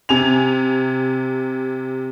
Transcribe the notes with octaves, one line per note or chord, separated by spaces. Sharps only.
C3 G#5 F7